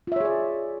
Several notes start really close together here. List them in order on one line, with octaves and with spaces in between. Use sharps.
F4 E5 C#5 G#4 D5